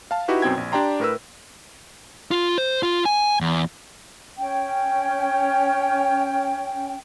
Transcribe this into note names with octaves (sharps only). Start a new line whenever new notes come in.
F5 A5
D#4 E4 F#4 G4 B4
F#2 B2 C4 G5 G#6
A#1
D4 G4 D5 G5 A#5 C6
A2 A#4 B4 E6
F4
C5
F4
G#5
E2
C#4 G5